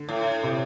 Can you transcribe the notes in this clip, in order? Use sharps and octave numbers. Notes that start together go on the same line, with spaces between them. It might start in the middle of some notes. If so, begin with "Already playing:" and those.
Already playing: D3
A2
C3